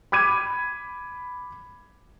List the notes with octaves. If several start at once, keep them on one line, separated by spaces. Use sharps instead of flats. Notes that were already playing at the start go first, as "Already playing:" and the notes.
B5 D6 G#6 D#7